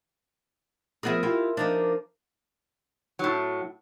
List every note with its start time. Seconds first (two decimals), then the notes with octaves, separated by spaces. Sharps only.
1.03 F3 B3 G#4 A#4 E5
1.23 E4 F4 G4
1.57 F3 A#3 D4 D#4
3.19 A2 F#3